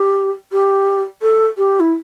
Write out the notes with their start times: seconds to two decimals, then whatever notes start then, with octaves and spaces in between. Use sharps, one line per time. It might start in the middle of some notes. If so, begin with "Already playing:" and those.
Already playing: G4
0.52 G4
1.21 A4
1.57 G4
1.80 E4